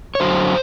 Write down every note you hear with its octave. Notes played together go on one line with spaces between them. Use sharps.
C#5
F#2 D3 F#3 C5